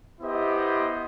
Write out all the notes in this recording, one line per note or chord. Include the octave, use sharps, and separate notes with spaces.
B3 E4 G4 C5 D#5